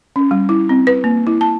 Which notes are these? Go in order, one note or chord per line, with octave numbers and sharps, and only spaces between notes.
C#4
G3
E4
C4
B4
A#3
E4
A5